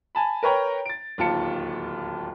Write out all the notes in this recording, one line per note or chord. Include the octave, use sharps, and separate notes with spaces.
G#5 A5 B5
A#4 B4 C#5 G5 A#5
A6 D7
D1 D#2 F4 A5 C#7